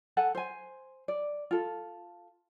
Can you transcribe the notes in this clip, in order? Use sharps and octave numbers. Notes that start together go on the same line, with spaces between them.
A4 F#5 G#5
C5 G#5
D5
F4 A4